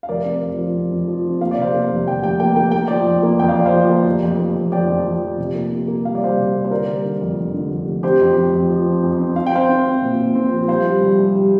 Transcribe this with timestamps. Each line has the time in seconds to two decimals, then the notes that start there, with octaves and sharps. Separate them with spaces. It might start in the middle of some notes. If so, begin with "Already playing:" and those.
0.03 F5
0.09 F1 A#4 D5
0.25 C4
0.42 F2
0.58 F3
0.75 C4
0.91 F2
1.08 F3
1.25 C4
1.41 A#3 F5
1.51 D5
1.57 C3 C5 F5
1.74 A#3
1.91 F1
2.07 F1 G5
2.23 F1 G5
2.40 A#3 G5
2.56 A#3 G5
2.71 A#3 G5
2.88 F3 D5 G5
3.06 F2
3.23 A#3
3.39 F2 G5
3.49 F5
3.57 F2 D5
3.65 C5 F5
3.73 F3
3.90 A#3
4.06 F1
4.22 F2
4.39 A#3
4.56 F2
4.72 F3 D5 G5
4.89 F2
5.05 F2
5.22 F3
5.38 C3
5.55 A#3
5.72 A#3
5.88 A#3
6.04 G3 F5
6.15 D5
6.21 G3 C5 F5
6.38 C3
6.54 A#3
6.65 C5
6.70 D3 A#4 D5
6.88 G3
7.05 D3
7.21 F2
7.37 F1
7.54 D3
7.70 F1
7.86 F1
8.03 C4 G4 C5
8.20 F2
8.36 F2
8.53 F2
8.70 F3
8.86 C4
9.03 F2
9.19 C4
9.35 C4 F5
9.46 G5
9.53 C4 C5 F5
9.69 C4
9.86 C4
10.02 A#2
10.19 A#2
10.35 C4
10.52 F3
10.68 G3 C5 F5
10.84 G3
11.01 C2
11.18 C2
11.35 G3